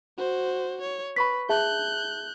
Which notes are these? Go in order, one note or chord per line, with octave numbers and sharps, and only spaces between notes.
F#4 C5
C#5
B4 B5 C#6 B6
G#4 E5 A5 F#6 G6